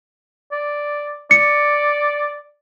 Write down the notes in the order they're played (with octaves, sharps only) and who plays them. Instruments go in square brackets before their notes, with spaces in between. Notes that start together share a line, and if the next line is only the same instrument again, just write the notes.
[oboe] D5
[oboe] D5 [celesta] C#7